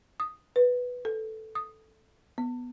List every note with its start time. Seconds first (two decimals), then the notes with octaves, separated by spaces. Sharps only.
0.20 D#6
0.56 B4
1.05 A4
1.55 D#6
2.38 B3